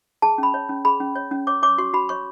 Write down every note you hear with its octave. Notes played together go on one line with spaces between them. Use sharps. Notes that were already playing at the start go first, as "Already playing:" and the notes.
G#4 A5
C#4 B5
C#5
C#4
G#4 B5
C#4
C#5
C#4
C#5 D6
C#5 D6
F#4 C#6
F#4 B5
C#5 C#6